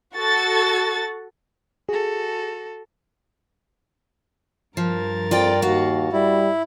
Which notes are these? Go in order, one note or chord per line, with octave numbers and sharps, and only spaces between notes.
F#4 A4 A6
F#4 G#4 A4
G2 F3 A#4 A6
F2 F4 D5 G5
D#2 F#4 F5
G3 E4